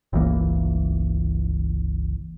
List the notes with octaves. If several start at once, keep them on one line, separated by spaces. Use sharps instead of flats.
G1 C#2 E3 A#3